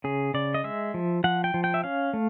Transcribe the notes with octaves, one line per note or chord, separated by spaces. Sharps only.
C#3 G#4
C#3 D5
D#5
G#3 E5
F3
F3 F#5
G5
F3
G5
E5
C#4 F5
A3